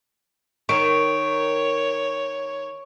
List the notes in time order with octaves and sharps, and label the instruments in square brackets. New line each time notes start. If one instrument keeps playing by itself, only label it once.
[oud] D#3 [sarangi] C#5 [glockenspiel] C#6 D7